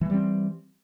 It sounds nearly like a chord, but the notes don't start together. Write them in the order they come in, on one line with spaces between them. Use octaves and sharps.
E3 G#3 G3 C4